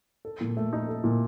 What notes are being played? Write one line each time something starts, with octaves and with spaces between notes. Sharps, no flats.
A4
A#2
A3
D#4
A4
A#2